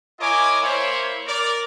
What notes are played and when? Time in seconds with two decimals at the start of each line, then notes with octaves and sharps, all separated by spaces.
0.20 E4 A#4 C#5 D#5 G#5 D6
0.62 A#3 E4 C5 C#5
1.27 A#4 D5